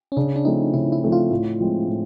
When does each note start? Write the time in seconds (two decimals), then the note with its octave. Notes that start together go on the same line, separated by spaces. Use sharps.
0.12 C#4
0.17 C#3 D4
0.36 D4
0.45 F3 A3 C4 D#4
0.74 C#3 E4
0.92 E4
1.03 F3 A3 C4
1.12 F4
1.30 A2
1.60 F3 G#3 C4
1.88 A2